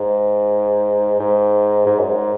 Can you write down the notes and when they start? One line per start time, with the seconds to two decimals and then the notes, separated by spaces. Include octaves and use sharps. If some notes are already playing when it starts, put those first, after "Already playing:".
Already playing: G#2
1.19 G#2
1.86 G#2
1.98 F#2
2.09 G#2